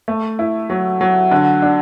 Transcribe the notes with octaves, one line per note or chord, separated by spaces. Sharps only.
A3
E4
F#3
F#3
D3
D4